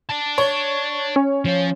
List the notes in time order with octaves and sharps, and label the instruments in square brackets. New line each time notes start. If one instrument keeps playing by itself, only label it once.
[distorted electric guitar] D5 A5
[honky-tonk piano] C#5
[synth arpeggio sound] C#4
[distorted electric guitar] F3 F4